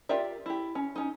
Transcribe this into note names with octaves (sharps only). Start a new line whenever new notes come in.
F4 G4 A#4 D5 E5
E4 G4
C#4
C#4 D#4